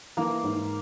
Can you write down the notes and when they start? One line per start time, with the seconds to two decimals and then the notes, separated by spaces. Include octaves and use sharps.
0.17 E3 A#3
0.44 G#2